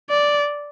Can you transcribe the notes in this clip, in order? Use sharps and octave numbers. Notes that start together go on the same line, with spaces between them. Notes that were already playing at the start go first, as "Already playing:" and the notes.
D5